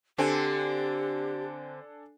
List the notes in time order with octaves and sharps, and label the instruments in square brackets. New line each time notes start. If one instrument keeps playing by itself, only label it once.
[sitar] D3 C4 [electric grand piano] D4 A4 G#5 [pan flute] G4